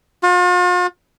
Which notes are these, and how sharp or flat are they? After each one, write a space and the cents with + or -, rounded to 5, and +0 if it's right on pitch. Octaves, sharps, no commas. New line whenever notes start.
F4 +45